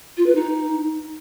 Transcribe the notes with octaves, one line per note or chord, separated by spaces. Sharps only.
F4
B4
D#4